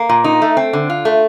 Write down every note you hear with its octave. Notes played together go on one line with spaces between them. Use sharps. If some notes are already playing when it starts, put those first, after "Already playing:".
Already playing: A#3
A#2
D#4
A3
C4
D3
F4
A3